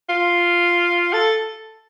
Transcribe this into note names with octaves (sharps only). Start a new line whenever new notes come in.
F4
A4